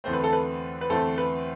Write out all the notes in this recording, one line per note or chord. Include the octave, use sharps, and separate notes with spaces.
E2 D3 A3 C4 C5
B4
A4
B4
B4
E2 D3 A3 C4 A4
B4